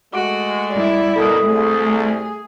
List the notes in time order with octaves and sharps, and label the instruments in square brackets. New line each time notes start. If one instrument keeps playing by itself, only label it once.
[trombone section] G#3 A3 [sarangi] F#4 [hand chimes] D6 D7
[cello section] G3 E4 [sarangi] D5
[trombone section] B2 A#4 [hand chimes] A4 D#6
[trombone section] C2 [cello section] A3 [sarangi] G#4